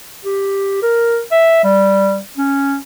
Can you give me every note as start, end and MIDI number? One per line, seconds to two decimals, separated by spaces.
0.25 0.81 67
0.83 1.21 70
1.31 1.61 76
1.64 2.20 55
2.37 2.77 61